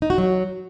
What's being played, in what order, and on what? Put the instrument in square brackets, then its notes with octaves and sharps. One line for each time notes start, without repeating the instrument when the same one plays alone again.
[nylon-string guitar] D#4
F#4
F#3